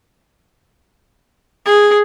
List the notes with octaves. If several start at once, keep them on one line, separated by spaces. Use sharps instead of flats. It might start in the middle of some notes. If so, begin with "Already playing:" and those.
G#4